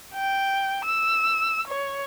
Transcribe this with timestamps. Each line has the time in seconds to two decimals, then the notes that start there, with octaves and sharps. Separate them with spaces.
0.14 G5
0.86 E6
1.68 C#5